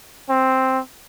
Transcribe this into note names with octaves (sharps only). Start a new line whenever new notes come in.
C4